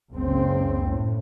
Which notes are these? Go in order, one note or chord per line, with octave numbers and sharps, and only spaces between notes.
F#1 C#2 C4
A2